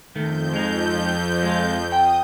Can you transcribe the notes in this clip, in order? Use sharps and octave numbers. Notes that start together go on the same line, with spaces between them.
F2 D#3 A3 G6
G#3 D#4
G#3 F4
G5 D#6